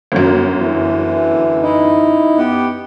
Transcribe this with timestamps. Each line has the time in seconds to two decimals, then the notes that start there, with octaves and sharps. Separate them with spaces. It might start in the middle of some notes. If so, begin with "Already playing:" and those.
0.12 G1 F#2
0.57 D3 E3
1.63 D#4 E4
2.38 B3 G4